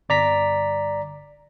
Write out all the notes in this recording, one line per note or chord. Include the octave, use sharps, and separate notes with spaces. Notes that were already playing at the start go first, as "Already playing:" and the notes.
G1 D5 A#5 B6